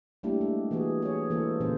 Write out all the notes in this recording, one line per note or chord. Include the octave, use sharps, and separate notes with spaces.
G3 A3 A#3 D4 E4 G4
G#3
E3 A#3 F#4 G#4
G#4 C#5
E3 G#3 A#3 A4 A#4 C5
A#2 D3 E3 C#4 C5